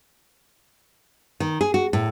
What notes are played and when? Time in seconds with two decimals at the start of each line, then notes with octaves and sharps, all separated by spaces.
1.40 D#3
1.61 G#4
1.74 F#4
1.93 A2